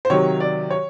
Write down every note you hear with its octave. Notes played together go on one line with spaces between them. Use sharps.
C5
C3 D#3 F#3 C#5
D5
C#5